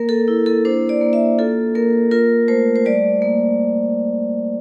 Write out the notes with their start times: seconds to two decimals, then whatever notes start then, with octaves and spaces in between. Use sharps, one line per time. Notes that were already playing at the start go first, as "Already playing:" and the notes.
Already playing: A#3 A#4
0.09 A4
0.28 E4
0.46 A4
0.65 D4 C5
0.89 D5
1.01 A#3
1.13 E5
1.38 F4 A4
1.75 A#3 A#4
2.11 F4 A#4
2.48 A3 C5
2.76 C5
2.85 G3 D5
3.22 A#3